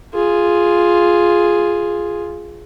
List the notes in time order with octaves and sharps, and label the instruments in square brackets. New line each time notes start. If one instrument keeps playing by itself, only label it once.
[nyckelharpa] F4 G#4